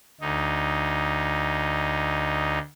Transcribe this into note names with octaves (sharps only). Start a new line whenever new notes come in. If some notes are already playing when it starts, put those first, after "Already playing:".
D2 D#4